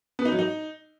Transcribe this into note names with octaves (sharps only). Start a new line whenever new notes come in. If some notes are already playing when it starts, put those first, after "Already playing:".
B3
D#4
F#3
D#4